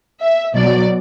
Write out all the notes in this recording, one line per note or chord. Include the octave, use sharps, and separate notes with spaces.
E5
B2 F#3 D5